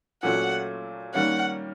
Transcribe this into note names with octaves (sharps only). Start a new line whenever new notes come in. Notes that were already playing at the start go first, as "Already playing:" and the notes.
A#2 F#3 A3 C#4 F4 F#5
D#3 G3 A#3 C#4 F#5